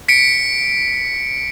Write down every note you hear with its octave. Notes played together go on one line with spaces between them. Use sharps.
B6 C#7 D7